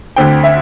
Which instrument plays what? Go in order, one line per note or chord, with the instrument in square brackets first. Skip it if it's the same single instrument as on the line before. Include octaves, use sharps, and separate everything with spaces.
[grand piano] D2 D3 C4 G5
E5